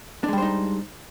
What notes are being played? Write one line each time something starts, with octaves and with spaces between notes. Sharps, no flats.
G3 G#3 D4 D#4 C5